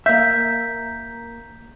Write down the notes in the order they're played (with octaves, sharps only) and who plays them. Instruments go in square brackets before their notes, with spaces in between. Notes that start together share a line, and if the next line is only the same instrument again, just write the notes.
[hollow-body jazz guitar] A#3 E5 [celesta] G6 B6